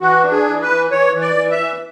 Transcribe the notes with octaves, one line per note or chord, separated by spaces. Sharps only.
E3 F#4
D4
G#4
E3
B4
E3
E3 C#5
E3
D5
E3
E5
E3